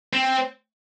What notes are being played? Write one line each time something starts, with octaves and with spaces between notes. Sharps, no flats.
C4